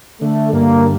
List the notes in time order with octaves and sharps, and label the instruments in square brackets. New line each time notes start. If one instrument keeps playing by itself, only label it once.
[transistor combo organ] D3 [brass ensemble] A3
[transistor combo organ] G2 [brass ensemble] A#3